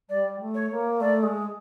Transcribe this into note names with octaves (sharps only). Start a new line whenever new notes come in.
G3 D5
A3
C#5
A#3
A3 D5
G#3